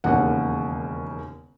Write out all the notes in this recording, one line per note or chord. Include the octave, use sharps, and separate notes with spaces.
E1 D#2 C#3 F#5